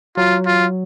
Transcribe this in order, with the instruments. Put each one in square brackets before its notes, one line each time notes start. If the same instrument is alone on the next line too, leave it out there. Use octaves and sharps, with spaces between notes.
[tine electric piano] F#3 [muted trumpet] F4
[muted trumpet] F4